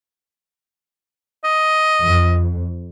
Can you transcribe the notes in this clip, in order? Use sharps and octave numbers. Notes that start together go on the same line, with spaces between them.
D#5
F2